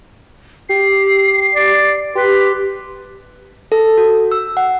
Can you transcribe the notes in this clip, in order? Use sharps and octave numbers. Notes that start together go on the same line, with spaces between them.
G4 C7
D5
G4 B4 C6
A4
F#4
E6
F#5